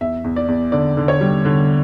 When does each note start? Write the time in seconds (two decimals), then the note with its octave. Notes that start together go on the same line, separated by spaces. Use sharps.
0.01 E2 E5
0.24 E2
0.36 D5
0.48 E2
0.72 D3 D5
0.97 D3
1.08 C#5
1.21 G3
1.45 D3